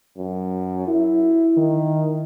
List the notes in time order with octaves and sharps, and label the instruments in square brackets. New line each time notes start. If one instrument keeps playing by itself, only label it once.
[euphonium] F#2
E4
[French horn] D#3